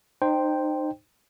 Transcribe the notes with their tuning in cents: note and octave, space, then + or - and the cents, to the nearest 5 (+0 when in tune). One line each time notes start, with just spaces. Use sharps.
D#4 -30 C5 +0 G5 +0